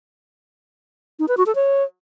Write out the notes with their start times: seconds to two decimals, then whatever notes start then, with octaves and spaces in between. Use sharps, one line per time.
1.19 D#4
1.28 B4
1.37 F#4
1.46 A4
1.55 C#5